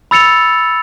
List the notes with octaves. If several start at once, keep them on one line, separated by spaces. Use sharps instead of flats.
B5 E6 A6 C#7 F7